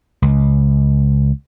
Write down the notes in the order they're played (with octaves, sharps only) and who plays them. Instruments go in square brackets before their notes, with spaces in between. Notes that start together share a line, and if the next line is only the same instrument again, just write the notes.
[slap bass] C#2